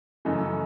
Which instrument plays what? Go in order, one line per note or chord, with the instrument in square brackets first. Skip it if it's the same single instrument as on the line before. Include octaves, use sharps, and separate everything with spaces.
[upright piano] F#2 C#3 E3 A3 D#4